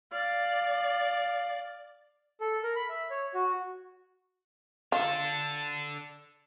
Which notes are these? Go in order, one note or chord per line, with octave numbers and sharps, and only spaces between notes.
D5 F5
A4
A#4
B5
E5
C#5
F#4
D4 F4 A4 A5